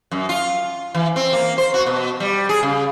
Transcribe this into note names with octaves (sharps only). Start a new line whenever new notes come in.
F#2
F4
E3
C4
A#3
C5
F#4
B2
G3
G#4
C#3